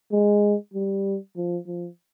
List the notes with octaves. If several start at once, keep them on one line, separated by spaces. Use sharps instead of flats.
G#3
G3
F3
F3